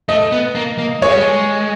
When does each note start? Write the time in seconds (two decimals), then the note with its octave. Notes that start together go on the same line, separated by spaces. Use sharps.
0.09 A3 D#5
0.32 B3
0.55 A#3
0.78 A#3
1.02 G#3 C#5
1.12 G3
1.22 G#3